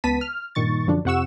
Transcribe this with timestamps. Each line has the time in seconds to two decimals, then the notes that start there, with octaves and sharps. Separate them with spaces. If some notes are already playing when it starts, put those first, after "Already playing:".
0.04 C#2 B3 A5 B6 D#7
0.21 F6
0.55 G2 A#2 D#3 C#6 A6
0.87 F#2 D3 F3 D4
1.05 F2 C3 F#5 C#6 E6 E7